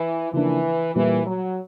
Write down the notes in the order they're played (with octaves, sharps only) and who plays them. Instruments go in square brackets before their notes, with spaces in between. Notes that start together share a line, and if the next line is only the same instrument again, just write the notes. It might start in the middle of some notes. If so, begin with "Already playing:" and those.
Already playing: [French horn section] E3
[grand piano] C#3 F3 A#3 D4 [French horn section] E3
[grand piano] A#2 G3 A#3 [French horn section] E3
[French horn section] F#3